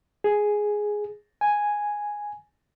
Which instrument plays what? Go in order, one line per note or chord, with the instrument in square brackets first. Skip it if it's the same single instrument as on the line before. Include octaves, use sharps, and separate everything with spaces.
[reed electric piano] G#4
G#5